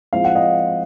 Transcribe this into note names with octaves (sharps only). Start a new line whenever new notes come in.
F3 G#3 C4 E4 F5
F#5
D#5 F5